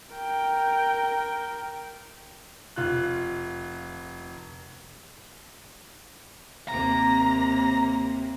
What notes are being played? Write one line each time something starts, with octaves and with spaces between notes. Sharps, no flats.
A#4 G5
F1 F4 F#6
D#2 C3 A#3 A#5